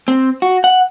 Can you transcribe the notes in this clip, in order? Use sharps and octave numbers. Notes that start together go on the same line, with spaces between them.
C4
F#4
F#5